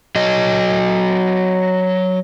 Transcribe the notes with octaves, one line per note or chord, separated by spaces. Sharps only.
F#3 D#5